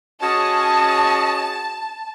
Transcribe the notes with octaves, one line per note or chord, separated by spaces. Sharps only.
C#4 F#4 G#4 D#5 A5